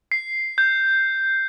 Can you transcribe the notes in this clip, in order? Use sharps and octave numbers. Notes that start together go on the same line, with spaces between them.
C7
G6